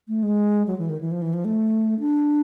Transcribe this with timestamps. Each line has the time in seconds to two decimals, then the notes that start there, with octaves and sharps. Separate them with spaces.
0.08 A3
0.23 G#3
0.67 F#3
0.78 E3
0.89 D#3
1.01 E3
1.11 F3
1.22 E3
1.33 F3
1.45 A3
2.00 D4